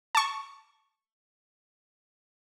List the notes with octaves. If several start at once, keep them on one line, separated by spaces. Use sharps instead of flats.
A5 C#6